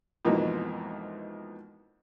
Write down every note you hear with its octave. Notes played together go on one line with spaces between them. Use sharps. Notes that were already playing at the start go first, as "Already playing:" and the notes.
F2 G#2 B2 E3 A#3 D#4